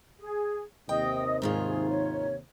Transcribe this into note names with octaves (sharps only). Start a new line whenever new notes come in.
G#4
D#2 C3 D#5 G5 D#6
G#2 D#3 F4 G#4
C#5